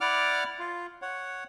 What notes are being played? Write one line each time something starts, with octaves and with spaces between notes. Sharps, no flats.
E4 D5 F#5 D6 F6
F4
C#5 F#5